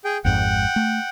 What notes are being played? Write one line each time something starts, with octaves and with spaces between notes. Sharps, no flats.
G#4 G5
G#1 F2 G#2 F#5 G5
A3